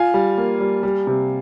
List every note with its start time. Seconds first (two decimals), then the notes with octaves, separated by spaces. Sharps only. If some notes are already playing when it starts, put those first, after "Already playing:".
Already playing: F4 F5 G#5
0.14 G3
0.38 A#3
0.60 G3
0.83 G3
1.07 C3